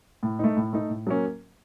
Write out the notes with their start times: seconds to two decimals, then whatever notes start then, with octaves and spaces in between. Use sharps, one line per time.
0.23 A2
0.39 A3 D#4
0.57 A2
0.73 A3 D#4
0.89 A2
1.07 F#3 A#3 C#4